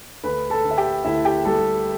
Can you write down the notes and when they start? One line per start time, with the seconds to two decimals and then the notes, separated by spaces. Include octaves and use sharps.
0.24 D2 B4 B5
0.50 A4 A5
0.65 D3
0.70 E5
0.77 G4 G5
1.04 D2 E4 E5
1.25 G4 G5
1.45 G3 A4 A5